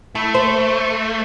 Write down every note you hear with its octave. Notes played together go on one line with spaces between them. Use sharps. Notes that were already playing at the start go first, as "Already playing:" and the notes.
A3 E4
C5